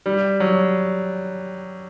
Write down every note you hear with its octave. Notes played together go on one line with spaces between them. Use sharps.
G3
F#3